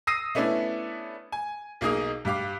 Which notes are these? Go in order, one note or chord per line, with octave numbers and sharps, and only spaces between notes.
D#6 E6 A#6 C7 D#7
A3 B3 C#4 D4 E4
G#5
B1 A#3 D#4 G#4 D#5 D#6
G2 G4 F5 D6